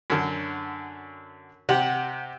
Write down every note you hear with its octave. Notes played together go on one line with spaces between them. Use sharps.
F#2 D3
C3 G4 F#5